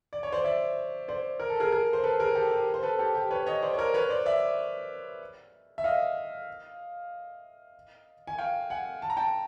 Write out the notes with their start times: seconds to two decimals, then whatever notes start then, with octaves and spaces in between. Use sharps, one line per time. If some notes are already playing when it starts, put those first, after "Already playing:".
0.13 D5
0.23 C#5
0.32 C5 D5
0.44 D5 E5
1.08 C5 D5
1.40 A#4
1.50 A4
1.60 G#4 A#4
1.72 G#4 A#4
1.93 C5
2.04 A4 B4
2.20 G#4 A#4
2.35 G4 A4
2.51 G4
2.74 C5
2.83 A4 B4
2.99 G4 A4
3.15 G4
3.31 B4 C#5
3.46 C#5 D#5
3.62 C5 D5
3.74 C#5
3.78 A#4 C5
3.94 B4 C#5
4.09 C5 D5
4.26 D5 E5
5.78 E5
5.84 D#5 F5
8.27 G#5
8.39 F5 G5
8.70 F#5 G#5
9.02 A5
9.10 A#5
9.17 G5 A5